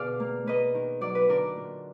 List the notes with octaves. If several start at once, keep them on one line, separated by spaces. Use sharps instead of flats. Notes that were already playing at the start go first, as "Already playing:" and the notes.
Already playing: B2 D3 G#4 D5 F5
A#3
A#3 B4 D#5
D#3
F#3 D5
B4
D3 A#4 D5
A#2